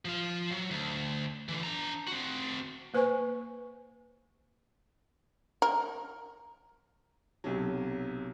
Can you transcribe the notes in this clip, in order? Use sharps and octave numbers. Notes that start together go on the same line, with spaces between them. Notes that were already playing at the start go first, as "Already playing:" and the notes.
F3 F5
F#3
D2
D3 E3
D4 A#5
C4 F#4
A#3 B4 C5 G#5 C#6
A#4
B1 C3 F#3